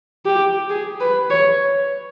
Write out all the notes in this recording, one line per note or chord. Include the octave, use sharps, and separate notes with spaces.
G4
G#4
B4
C#5